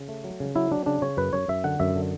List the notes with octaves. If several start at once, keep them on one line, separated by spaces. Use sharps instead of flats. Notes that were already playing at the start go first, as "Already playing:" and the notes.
Already playing: C#3
A3
F#3
C#3
F#3 E4
F#3 D4
C#3 D4
C#3 C#5
F#2 B4
F#2 C#5
F#2 E5
D3 F#5
F#2 E5
D3